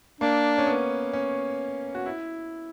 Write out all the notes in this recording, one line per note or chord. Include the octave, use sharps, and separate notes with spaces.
A#3 D4
C#4
B3
C#4
F#4
E4